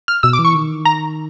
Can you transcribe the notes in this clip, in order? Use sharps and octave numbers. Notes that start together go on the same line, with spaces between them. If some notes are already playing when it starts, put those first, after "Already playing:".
F6
B2 E6
D6
E3
C#6
D#3
A#5